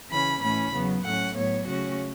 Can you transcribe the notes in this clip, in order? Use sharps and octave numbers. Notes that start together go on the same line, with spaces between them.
C#3 E3 C#4 B5
A2 E3 A3 C#4 B5
E2 C#3 F#3 B3
A2 F#3 A3 C#4 F#5
A2 F#3 B3 C#5
C#3 A3 C#4 F#4